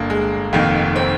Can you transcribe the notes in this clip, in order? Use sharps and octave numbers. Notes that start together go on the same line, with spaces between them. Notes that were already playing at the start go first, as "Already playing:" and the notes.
Already playing: G1 A#3 D4
G#3
F1 F2 D#3 A#3
C4